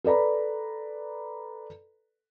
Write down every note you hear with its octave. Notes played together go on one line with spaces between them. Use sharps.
A4 B4 D5 A#5 B5